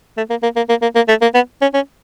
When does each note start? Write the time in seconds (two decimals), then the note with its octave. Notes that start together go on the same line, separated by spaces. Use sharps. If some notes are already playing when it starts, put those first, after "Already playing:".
0.17 A3
0.30 A#3
0.43 A#3
0.56 A#3
0.69 A#3
0.82 A#3
0.95 A#3
1.08 A3
1.22 A#3
1.35 B3
1.61 C#4
1.74 C#4